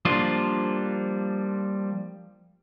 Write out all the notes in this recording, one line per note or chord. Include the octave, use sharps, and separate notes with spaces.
F3 G3 A#3 D4 F4